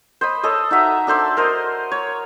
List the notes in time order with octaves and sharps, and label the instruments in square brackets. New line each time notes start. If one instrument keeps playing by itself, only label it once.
[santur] C5 D#5 B5
A4 C#5 D#5
D#4 F#4 E5 A#5
D4 A4 C5 D5
A#4 C5 D#5
C#5